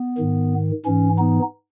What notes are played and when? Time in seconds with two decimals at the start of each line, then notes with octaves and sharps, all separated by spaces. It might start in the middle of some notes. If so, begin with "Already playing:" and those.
Already playing: B3
0.18 G#2 D#3
0.85 G#2 E3 C#4
1.18 B3 D#4